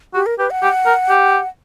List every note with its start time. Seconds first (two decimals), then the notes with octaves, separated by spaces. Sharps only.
0.14 F#4 G4
0.26 A#4
0.38 G4 B4
0.51 F#5
0.62 G4
0.86 A#4
1.09 G4